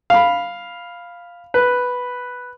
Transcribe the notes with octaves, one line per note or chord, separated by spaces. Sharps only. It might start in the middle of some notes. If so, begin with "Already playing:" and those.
F5 B5
B4